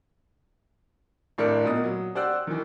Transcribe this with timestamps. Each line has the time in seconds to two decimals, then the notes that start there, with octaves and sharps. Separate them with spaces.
1.38 G#1 A2 D4 A#4 D5 C#7
1.64 A#2 B3 D#5 D#6
1.84 F#3
2.15 G4 C5 D5 F#5 E6 F#6
2.47 D#3 E3